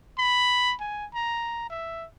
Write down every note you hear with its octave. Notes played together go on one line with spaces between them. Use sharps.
B5
G#5
A#5
E5